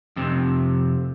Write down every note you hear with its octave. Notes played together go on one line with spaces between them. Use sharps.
F2 C3